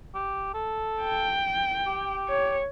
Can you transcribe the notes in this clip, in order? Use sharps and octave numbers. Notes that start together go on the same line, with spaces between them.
G4
A4
G5
G4
C#5